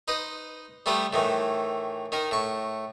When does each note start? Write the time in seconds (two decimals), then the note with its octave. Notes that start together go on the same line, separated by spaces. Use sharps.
0.08 D#4 B4 C5 D#5
0.86 G3 A3 B3 B4 C5
1.13 A2 D#3 E3
2.12 D#3 D#4 A#4
2.31 A2 C#6